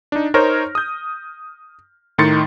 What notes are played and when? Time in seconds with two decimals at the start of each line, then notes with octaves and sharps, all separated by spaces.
0.12 D4 D#4
0.34 D#4 A#4 C5 C#5 F6 A#6
0.75 D#6 G6
2.18 A2 D#3 D#4 C6 A6 C#7